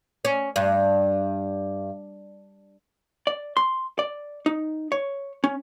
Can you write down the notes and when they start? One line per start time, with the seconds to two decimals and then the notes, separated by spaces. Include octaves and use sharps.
0.25 C#4
0.56 G2
3.27 D5
3.57 C6
3.99 D5
4.46 D#4
4.92 C#5
5.44 C#4